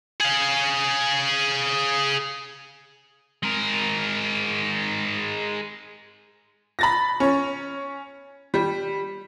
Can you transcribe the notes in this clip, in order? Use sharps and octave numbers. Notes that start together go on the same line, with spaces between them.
G#4 F5
G#3 A#4
B5 A6 A#6
C#4 C#5
G3